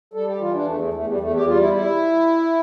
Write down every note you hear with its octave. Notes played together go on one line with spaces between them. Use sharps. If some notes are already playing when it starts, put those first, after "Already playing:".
G3 A4
G4
E3 F4
D4
E2 A3
A3
E2 A3
G3
E2 A3
G4
G3 F4
E4
E4